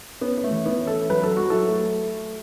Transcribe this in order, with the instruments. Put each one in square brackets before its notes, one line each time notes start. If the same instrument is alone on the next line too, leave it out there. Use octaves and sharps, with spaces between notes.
[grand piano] B3 [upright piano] C#4
[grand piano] B3
A3
[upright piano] E3
[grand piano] B3 E4
[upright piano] C#4
[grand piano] E4 A4
[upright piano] F#3 [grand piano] B4
[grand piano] A4
[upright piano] F#3 [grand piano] F#4
[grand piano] E4 A4
[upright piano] A3